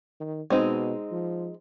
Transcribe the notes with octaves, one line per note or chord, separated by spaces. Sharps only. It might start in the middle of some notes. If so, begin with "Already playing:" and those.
D#3
B2 G#3 C4 D#4
F3